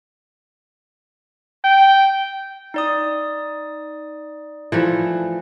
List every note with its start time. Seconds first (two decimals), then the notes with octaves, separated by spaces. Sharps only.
1.64 G5
2.74 D#4 D5 D#6
4.72 E3 F3 A3